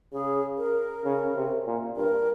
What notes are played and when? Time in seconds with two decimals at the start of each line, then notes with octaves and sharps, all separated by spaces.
0.13 C#3 G#4
0.58 A#4
1.05 C#3
1.35 C3
1.66 A#2
1.97 G2 A#4